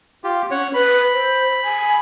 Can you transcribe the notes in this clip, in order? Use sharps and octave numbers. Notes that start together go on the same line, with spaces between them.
F4 G4
C#4 C#5 F#5
B4 B5
C5
G#5